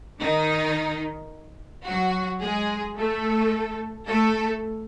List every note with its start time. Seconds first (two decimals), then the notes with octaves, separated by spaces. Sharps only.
0.21 D#3 D#4
1.87 F#3 F#4
2.42 G#3 G#4
2.97 A3 A4
4.08 A3 A4